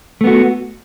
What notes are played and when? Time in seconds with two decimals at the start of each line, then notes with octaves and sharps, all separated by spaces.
0.21 A3
0.24 B3
0.27 F#4